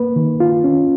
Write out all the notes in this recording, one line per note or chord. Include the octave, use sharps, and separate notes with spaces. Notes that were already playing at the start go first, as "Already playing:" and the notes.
Already playing: A#3 B4
D#3
F4
C#4